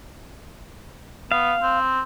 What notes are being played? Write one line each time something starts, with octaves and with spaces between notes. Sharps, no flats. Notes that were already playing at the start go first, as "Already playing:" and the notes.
B3 F5
C4